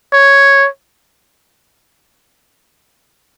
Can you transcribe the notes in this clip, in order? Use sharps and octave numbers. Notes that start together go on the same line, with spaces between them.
C#5